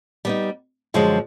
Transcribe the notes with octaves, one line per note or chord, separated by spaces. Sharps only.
G3 B3 D#4
F#2 D3 F3 G#3